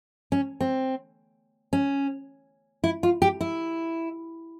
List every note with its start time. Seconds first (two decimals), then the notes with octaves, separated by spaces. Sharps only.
0.32 C#4
0.60 C4
1.73 C#4
2.84 E4
3.03 F4
3.22 G4
3.41 E4